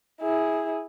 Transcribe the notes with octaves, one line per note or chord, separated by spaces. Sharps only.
E4 G#4